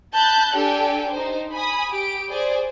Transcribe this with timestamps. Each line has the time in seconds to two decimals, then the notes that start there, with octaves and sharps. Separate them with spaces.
0.13 A5 B5 F#6 G6
0.55 D4 G4 A4 G5 G#5
1.11 D#4 C5
1.53 G#5 B5 D#6
1.90 G4 D7
2.29 G#4 C5 D5